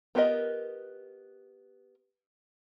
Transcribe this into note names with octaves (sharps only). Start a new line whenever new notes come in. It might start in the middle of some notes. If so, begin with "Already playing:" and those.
B3 F4 G4 A#4 D#5